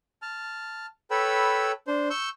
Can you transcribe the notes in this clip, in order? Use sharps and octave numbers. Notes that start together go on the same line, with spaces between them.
A5 F6
A4 B4 C#5 G5 B5 E6
D4 C5
C#6 E6 G6